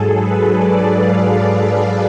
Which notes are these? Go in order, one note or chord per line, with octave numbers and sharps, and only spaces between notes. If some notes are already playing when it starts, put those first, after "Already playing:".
Already playing: G#2 F#3 G#4 A4
B4
D5
F5
F5
D5